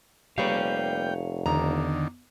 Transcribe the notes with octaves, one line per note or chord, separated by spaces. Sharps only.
F1 G3 A#3 B4 C#5 F5 G5
E2 D3 D#3 A#5